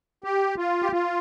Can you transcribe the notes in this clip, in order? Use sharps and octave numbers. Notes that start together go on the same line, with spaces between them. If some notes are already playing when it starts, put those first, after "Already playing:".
G4
F4
G4
F4